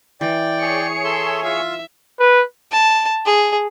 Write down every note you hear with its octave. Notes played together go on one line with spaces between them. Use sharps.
E3 D5 G5
G#4 C#5 C#7
A4 E5 C6
F4 E5 E6
B4
A5
G#4